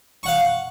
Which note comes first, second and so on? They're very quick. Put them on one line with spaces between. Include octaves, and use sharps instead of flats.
C#6 F#5 F5